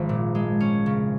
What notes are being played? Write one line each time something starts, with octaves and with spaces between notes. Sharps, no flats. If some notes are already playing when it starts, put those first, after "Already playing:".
Already playing: G#1 F3
A#2
G#3
C#4
C#3